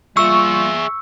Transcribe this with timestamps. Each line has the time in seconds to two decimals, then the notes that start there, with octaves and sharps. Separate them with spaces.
0.17 G3 A#3 F4 G#4 E5 C#6 E6